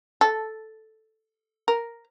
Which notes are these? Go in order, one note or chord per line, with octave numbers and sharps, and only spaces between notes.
A4
A#4